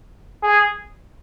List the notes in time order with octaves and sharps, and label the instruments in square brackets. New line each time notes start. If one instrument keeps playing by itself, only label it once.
[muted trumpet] G#4